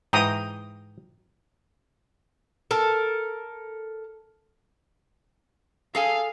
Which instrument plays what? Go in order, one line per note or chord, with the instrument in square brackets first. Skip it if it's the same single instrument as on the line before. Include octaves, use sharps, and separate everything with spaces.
[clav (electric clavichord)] G#2 E3 [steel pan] G5 A#5 D#6
[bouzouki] A4 A#4
[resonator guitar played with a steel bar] G#4 A4 G#5 [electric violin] F5